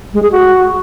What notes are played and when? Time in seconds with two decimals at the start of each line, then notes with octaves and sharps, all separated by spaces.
0.14 G#3
0.23 G#4
0.32 F#4